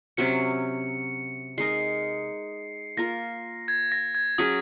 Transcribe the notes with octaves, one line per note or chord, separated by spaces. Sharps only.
C3 F#3 C#4 C#7
G#3 D#4 A#4 C7
A#3 F4 A#4 A#6
G#6
A#6
G#6
F#3 C#4 G#4 D#6